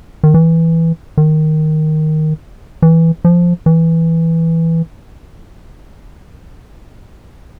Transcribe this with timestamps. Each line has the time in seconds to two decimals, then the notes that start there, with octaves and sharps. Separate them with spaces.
0.24 D#3
0.34 E3
1.18 D#3
2.82 E3
3.25 F3
3.66 E3